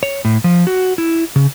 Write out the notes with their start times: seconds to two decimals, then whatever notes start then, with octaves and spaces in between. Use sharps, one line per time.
0.03 C#5
0.25 A2
0.44 F3
0.67 F#4
0.98 E4
1.36 C#3